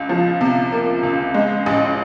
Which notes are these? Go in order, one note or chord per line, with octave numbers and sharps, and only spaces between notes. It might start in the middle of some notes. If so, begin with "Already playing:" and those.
Already playing: C#2
F3
C3
A#3
C#2
G#3
A1